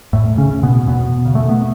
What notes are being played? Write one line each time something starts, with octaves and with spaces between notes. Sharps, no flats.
E2 A2 A3
C#3 C#4
C#3
B2 B3
E2 B2 B3
C#3
A3
B3